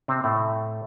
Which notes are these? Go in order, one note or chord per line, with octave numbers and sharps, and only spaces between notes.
C3 C4
A2 A3